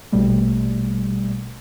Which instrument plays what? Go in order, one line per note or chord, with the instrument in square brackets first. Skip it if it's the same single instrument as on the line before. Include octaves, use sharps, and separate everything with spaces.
[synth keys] A#1 B2 G3 A3